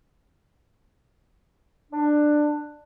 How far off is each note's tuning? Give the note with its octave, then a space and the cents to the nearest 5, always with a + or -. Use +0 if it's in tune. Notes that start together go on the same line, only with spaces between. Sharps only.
D4 +15